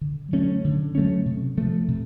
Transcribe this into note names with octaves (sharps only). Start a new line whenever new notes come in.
D3
F#3 A3 C#4
D3
F#3 A3 C#4
C3
F3 A3
C3